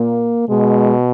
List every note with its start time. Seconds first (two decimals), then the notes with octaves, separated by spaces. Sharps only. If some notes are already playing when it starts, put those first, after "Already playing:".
Already playing: A#2 A#3
0.49 B2 G#3